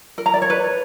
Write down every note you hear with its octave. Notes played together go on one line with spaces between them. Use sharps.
A#4
A#5
D5
C#5
B4